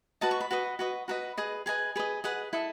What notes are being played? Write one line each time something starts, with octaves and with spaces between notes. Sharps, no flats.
F#4 B4 D#5 A5
C#6
B5
F#4 B4 D#5
F#4 B4 D#5
F#4 B4 D#5 B5
G#4 B4 D#5
G#4 B4 D#5 G#5
G#4 B4 D#5
G#4 B4 D#5 F#5
E4 A4 D#5